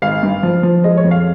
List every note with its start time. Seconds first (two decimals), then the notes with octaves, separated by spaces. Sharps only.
0.02 G#1 F5
0.23 G2
0.43 F3
0.63 F3
0.84 G#3 D#5
0.97 C#5
1.04 F2
1.11 F5